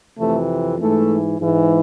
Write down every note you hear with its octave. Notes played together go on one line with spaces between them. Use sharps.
F2 C3 E3 A3
G#2 E3 A3
G#2 E3